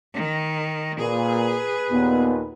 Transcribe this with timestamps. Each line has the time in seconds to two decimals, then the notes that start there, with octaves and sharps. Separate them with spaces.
0.14 D#3
1.00 A#2 G#4 B4
1.90 D#2 A#2 B3